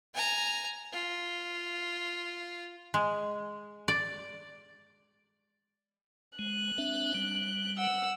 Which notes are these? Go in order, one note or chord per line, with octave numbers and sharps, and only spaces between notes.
G#5 A#5
F4
G#3
D5
G#3 F#6
C4 D4 E5
G3
F#5 E6